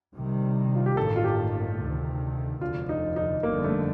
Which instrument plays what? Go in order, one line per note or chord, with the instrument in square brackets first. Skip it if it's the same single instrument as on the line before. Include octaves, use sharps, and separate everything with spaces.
[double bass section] C2 C3 D#3 G3
[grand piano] F4
G4
[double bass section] A1 G2 D#3 A#3 [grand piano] A4
[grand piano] F4
G4
[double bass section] D2 C3 D#3 A3
[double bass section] F1 D#2 D3 F3 [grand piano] F4
[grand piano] D#4
D#4
[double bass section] G1 F2 D3 [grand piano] A#3
[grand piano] A3